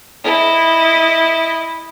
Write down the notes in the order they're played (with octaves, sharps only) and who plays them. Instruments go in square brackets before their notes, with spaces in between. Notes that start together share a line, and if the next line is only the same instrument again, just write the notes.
[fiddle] E4 D#5